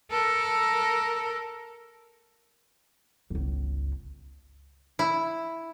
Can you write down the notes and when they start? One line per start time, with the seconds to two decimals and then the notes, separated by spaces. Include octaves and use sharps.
0.11 A4 A#4
3.30 G1 C#2
4.99 E4